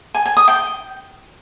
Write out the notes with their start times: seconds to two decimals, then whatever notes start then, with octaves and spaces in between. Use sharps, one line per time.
0.15 G#5
0.26 G#5
0.37 D#6
0.48 G5